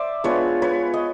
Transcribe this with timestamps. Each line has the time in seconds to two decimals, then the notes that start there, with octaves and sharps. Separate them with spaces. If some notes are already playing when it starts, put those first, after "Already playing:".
Already playing: C5 D5 E5
0.24 G#3 B3 D4 F4 B4 C#5
0.62 B4 C#5
0.94 D#5